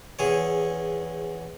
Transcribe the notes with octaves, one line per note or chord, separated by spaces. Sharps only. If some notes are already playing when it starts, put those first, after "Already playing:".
E2 G#4 C#5